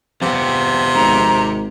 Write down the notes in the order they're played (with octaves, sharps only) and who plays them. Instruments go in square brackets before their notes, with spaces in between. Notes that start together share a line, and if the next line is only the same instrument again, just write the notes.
[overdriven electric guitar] F2 B3 [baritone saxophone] C3
[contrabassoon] G#1 [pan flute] A#5